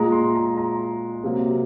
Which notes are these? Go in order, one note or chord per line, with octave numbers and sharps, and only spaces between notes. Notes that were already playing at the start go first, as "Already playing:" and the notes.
Already playing: A#2 G#3 A#5
C6
A#5
A#5
C3 F#3 A#3